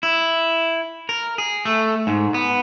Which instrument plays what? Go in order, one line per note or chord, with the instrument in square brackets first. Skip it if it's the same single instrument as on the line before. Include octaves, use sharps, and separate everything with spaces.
[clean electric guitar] E4
A#4
G#4
A3
G#2
B3